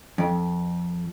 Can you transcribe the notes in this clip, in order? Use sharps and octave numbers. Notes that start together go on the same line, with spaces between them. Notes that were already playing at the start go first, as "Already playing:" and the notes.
F2